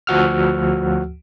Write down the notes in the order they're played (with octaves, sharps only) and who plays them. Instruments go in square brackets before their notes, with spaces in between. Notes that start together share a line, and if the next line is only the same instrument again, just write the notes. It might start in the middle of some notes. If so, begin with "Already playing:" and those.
[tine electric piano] D2 F3 F#4 F#5 E6 F6